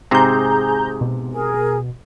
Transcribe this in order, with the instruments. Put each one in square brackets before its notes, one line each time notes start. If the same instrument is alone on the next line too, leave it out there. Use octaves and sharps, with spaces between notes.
[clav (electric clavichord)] G#2 C3 C4 [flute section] G#4 [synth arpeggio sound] A#5 G6
[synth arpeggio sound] B2
[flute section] G#4 A#4